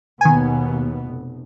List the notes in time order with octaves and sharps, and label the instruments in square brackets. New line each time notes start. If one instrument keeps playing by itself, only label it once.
[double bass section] D#2 B2 B3 [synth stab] D#3 G#5
[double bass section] F1